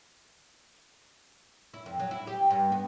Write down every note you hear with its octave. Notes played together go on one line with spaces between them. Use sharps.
E4
F2
F#3
E4
G4
G2
B3